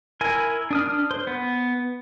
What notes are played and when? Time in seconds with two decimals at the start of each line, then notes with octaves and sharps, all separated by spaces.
0.21 E4 A#4 G#5
0.71 D4 D#6 F6
1.11 C5
1.27 B3